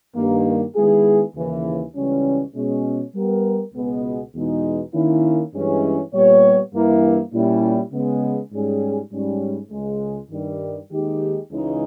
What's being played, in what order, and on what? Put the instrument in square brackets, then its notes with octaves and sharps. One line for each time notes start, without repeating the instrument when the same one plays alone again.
[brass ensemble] G2 D#3 A#3
D#3 G#3 B3 E4 G#4
D#2 C#3 E3
C#2 C#3 E3 G3 C#4
B2 G#3 C#4
G3 B3 G4 A#4
C#2 B2 G#3 B3
E2 B2 G#3 D#4
D#3 A#3 C#4 E4
G2 E3 G#3 C#4
A#2 G3 B3 G4 C#5
G2 E3 A#3 E4
A#2 G3 C#4 E4
C#3 G#3 B3
G#2 G3 C#4 G#4
G#2 G3 C#4
C#2 C#3 G#3
G2 D#3 G3
D#2 D#3 G#3 D#4 G4
C#2 C#3 E3 G#3 D#4